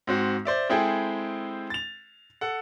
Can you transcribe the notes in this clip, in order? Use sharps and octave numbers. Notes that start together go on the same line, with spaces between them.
G#2 C4 F#4
C5 D5 E5
G#3 C4 E4 G#4 A4 G5
A6 F7
A4 F#5